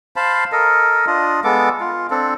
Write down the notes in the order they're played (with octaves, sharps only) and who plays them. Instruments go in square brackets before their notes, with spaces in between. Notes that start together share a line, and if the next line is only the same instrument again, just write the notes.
[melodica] C5 F5 A5 B5
A4 A#4 D#5
D4 F4 D#5
G#3 B3 A4 D6
F4
C4 D4 A4